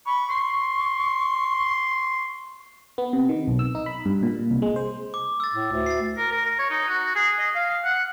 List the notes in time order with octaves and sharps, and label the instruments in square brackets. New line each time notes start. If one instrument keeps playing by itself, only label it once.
[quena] B5 [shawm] C#6
[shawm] C6 [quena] C#6
[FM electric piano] B3
C3
D#3
B1
E6
D#4
B5
G2
A#2
C2
G#3
C5
[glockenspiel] D6
E6 A6
[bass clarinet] A2
D2
[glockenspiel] A6 C7
[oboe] A#4
A#4
A#4
C#5
D#4
F#4
G#4
D#5
F5
F#5